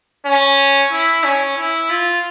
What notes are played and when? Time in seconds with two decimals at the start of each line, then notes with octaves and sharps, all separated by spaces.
0.26 C#4
0.92 E4
1.24 C#4
1.58 E4
1.90 F4